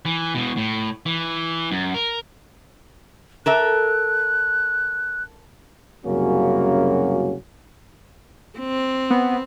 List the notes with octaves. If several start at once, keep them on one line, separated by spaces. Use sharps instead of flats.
E3
B2 E3
A2
E3
F#2
A#4
A4 A#4 E5 F#6
C2 F#2 C#3 A#3 C#4 F#4
C4
B3